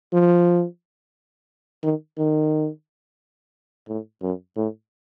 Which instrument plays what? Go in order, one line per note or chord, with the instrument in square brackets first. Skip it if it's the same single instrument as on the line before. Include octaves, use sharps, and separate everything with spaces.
[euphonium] F3
D#3
D#3
A2
F#2
A2